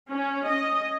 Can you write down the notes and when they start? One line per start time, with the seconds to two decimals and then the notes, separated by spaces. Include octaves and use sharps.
0.11 C#4
0.47 D#5